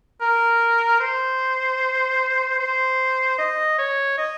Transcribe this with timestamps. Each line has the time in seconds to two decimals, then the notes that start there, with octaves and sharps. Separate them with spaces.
0.21 A#4
1.00 C5
2.59 C5
3.38 D#5
3.79 C#5
4.18 D#5